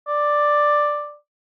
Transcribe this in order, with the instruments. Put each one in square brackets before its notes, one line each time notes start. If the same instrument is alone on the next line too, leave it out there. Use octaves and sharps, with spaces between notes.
[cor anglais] D5